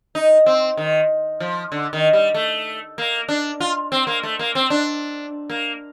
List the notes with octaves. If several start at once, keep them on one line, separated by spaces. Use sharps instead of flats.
D#4
C4
D#3
F3
D3
D#3
G3
A3
A#3
D4
F4
C4
A#3
A3
A#3
C4
D4
A#3